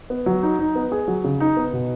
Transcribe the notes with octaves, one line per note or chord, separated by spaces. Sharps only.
B3
F#3
D#4
D#4
B3
G#4
F#3
C#3
D#4
B3
B2